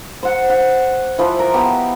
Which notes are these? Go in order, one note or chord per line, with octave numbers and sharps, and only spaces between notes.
C5 F#5
F#5
E3 F3 B4
A#4
B3 G4